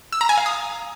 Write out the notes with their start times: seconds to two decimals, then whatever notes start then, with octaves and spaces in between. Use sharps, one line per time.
0.13 E6
0.21 A#5
0.29 G#5
0.38 F5
0.46 D#6